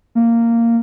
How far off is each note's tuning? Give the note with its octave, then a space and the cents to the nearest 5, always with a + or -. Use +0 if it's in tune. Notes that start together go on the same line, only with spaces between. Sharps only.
A#3 -10